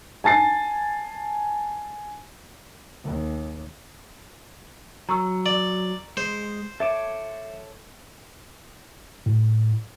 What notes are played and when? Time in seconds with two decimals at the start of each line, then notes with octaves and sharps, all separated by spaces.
0.24 G#5 A5 A6 C7
3.04 D#2
5.09 F#3 A#5 C#6 E6
5.46 D5
6.17 G#3 C5
6.80 A4 C#5 E5 D6 E7
9.26 A2